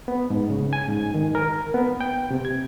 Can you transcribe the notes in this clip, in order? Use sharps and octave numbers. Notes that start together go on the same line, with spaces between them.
B3
G#2
C#3
G#5
G#2
D#3
A#4
B3
G5
C3
G#6